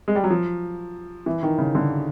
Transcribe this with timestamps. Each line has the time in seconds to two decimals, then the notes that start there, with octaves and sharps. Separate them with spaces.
0.08 G#3
0.15 G3
0.24 F#3
0.30 F3
1.26 E3
1.43 D#3
1.58 C#3
1.75 D3